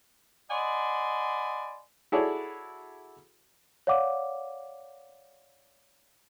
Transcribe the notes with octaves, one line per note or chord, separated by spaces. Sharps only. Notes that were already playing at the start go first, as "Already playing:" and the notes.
D5 D#5 F#5 G#5 B5 C6
E4 F#4 G#4 A4 C#5 D5
C#5 D5 F5 F#5 D6